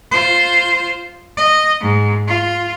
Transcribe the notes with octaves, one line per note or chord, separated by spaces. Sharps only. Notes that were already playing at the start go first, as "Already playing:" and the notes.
F4 C5
D#5
G#2
F4